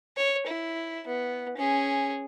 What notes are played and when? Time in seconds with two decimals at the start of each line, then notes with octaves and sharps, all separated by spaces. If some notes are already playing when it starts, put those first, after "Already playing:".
0.17 C#5
0.46 E4
1.07 B3
1.57 C#4 G#4